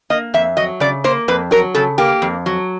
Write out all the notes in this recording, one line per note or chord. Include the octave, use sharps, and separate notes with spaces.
A#3 D#5
F2 E5
F#3 D#5
C#3 D5
A#3 C5
F2 B4
F#3 A#4
C#3 A4
A#3 G4
F2
F#3